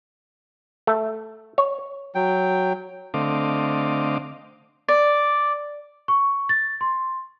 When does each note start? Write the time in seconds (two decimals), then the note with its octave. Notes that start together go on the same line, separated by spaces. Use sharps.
0.87 A3
1.58 C#5
2.15 F#3 G5
3.14 D3 A3 C4 D#5 F5 D6
4.88 D5
6.08 C#6
6.49 A6
6.81 C6